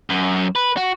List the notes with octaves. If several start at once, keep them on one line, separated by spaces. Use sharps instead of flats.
F#2
B4
F#4